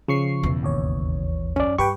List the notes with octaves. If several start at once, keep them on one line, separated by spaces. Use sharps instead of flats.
C#3 F3 C#6 C7
E2 B2
G#1 D#2 C#5
F#2 C#4 D5
G2 G4 B4 G5 C#6